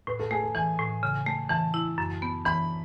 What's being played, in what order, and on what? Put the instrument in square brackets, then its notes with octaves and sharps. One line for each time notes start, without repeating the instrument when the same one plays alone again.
[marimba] A2 [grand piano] B4
[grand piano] A4
[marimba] A3 [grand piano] G#4
[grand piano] A4
[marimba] E3 [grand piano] G#5
[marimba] A2
C#3
A3
[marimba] E3 [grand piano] A5
[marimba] E4
F#2
B3
[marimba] E3 [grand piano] B5